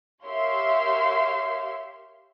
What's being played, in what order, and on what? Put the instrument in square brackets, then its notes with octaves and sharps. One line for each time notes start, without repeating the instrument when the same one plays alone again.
[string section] G4 A#4 C#5 E5 F5 C6